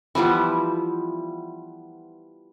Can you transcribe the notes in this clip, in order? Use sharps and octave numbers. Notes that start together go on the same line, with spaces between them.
E3 F3 G3 B3